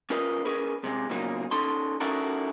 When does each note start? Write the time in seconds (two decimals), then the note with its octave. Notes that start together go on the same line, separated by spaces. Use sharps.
0.10 C#4 F4 A#4 B4 D#5
0.45 C#4 G#4 A#4 B4
0.84 C3 G#3
1.10 E2 A#2 C#3 F#3 A#3 D#4
1.51 C#4 D#4 A4 C6
2.00 C#4 D#4 E4 F#4 A4 A#4